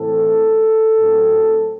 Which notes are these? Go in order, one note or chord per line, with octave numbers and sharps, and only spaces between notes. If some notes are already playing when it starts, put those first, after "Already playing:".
Already playing: A2 E3 A3 C4 A4
A2 F#3 C4